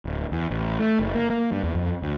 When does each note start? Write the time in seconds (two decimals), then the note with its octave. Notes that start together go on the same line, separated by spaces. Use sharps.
0.05 D1
0.32 E2
0.51 A1
0.80 A3
0.99 F#1
1.15 A#3
1.30 A#3
1.52 G2
1.64 E2
1.75 F2
2.02 D2